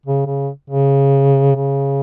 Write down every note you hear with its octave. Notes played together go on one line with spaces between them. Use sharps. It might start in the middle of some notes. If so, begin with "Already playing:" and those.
C#3
C#3
C#3
C#3